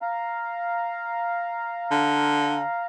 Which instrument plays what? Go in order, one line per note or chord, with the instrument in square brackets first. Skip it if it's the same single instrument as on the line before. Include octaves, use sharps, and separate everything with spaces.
[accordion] F5 A#5
[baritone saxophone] D3